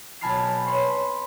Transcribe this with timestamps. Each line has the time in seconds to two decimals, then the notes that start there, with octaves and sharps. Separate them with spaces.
0.21 B1 G#5 A5 B5 F6 C7
0.66 B4 C#5 C6 C#6